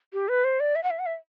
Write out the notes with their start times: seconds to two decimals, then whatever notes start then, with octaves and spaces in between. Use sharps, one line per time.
0.13 G4
0.29 B4
0.44 C5
0.60 D5
0.75 E5
0.84 F#5
0.90 E5
0.99 F#5
1.06 E5